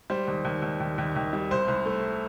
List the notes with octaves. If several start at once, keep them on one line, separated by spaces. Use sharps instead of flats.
G3 C5
D#2
D#2
D#2
D#2
D#2
D#2
G3
C2 C5
C2
A3